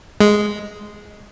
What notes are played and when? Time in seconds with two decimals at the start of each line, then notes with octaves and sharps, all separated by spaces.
0.20 G#3